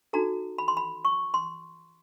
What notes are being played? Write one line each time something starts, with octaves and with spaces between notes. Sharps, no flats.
D#4 F#4 A4 A#5
B5
C6
B5
C#6
C6